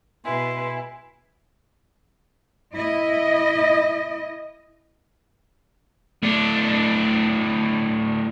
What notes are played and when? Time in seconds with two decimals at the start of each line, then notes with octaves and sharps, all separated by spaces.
0.25 B2 G#3 E4 B4 G#5 C6
2.74 E4 D#5
6.23 A2 D4